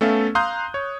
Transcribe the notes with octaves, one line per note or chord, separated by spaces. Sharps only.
A3 B3 C#4 A4 E5 F5
F5 A#5 C6 D#6 F#6 G6
C#5